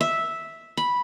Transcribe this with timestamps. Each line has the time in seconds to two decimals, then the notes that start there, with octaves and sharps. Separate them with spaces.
0.01 E5
0.77 B5